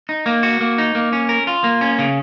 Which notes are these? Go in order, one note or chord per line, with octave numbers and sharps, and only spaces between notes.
D#4
A#3
F#4
A#3
D#4
A#3
C#4
A#4
F4
A#3
C#4
C#3